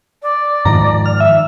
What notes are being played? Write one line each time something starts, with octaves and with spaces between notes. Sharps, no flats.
D5
G#2 D#3 F3 A#5
F6
E5